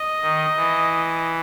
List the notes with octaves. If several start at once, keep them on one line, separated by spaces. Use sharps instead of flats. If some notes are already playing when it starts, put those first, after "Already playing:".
Already playing: D#5
D#3
E3